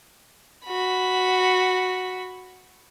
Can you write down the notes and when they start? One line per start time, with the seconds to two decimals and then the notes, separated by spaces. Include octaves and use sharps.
0.65 F#4 B5